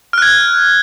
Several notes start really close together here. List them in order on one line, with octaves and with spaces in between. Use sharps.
F6 F#6 G#6